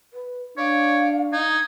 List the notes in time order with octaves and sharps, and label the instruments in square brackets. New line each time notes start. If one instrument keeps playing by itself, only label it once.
[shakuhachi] B4
[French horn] D4 [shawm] C#5 [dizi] D5 [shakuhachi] F5
[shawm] D#4 [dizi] G#6